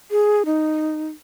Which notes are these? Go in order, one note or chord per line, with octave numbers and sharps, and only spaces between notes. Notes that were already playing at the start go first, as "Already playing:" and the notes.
G#4
D#4